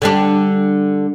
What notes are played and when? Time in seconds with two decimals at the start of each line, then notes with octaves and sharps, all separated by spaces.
0.02 D3 G3 D4